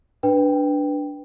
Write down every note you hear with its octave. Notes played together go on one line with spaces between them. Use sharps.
D4 B4 G5